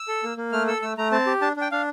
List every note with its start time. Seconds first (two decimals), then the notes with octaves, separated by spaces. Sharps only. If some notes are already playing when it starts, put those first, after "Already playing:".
Already playing: E6
0.08 A4
0.23 A#3
0.37 A#3
0.52 A3 F6
0.68 A4 E6
0.82 A3 E6
0.98 A3 A#5
1.12 C4 A5
1.27 G4
1.41 D4 A5
1.56 D4 G5
1.72 D4 F5